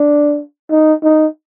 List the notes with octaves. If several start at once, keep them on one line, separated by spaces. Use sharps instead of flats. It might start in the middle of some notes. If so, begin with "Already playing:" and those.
Already playing: D4
D#4
D#4